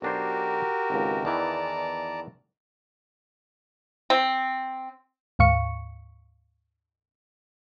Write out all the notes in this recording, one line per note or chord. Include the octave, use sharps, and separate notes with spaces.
B1 D4 F#4 G4 A#4 C5
G#1 C#2
E2 D#3 E3 D5 A5 A#5
C4
D2 G#2 F5 C#6 C#7